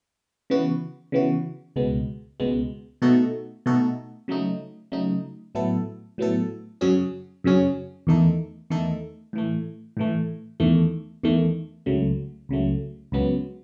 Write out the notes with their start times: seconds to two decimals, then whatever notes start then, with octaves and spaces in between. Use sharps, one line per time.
0.50 C#3 E3 B3 F#4
1.12 C#3 E3 B3 F#4
1.76 C#2 B2 G#3 B3
2.40 C#2 B2 G#3 B3
3.02 B2 A3 D#4 F#4 A4
3.66 B2 A3 D#4 F#4 A4
4.28 C#3 F#3 A3 D#4
4.92 C#3 F#3 A3 D#4
5.55 A2 F#3 B3 E4 A4
6.18 A2 F#3 B3 E4 A4
6.81 F#2 C#3 F#3 C#4 G#4
7.44 F#2 C#3 F#3 C#4 G#4
8.07 E2 D#3 A3 D#4 A4
8.70 E2 D#3 A3 D#4 A4
9.33 A2 E3 A3
9.97 A2 E3 A3
10.60 E2 D#3 A3
11.23 E2 D#3 A3
11.86 C#2 C#3 F#3 A3
12.49 C#2 C#3 F#3 A3
13.12 C#2 C#3 F#3 B3